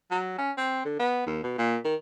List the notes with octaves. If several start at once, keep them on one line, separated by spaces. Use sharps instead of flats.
F#3
C#4
C4
D3
B3
D#2
B2
A#2
D#3